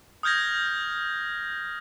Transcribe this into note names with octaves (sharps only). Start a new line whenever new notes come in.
D#6 F6 G6 G#6 A#6